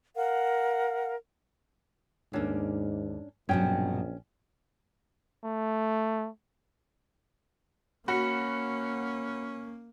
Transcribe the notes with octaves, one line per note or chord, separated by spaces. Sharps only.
A#4 F5 F#5
D#2 G#2 A#3 C#4 D4 A4
A#1 G2 B2 F#3 C#4 G5
A3
A#3 C#4 F#4 B5 C#7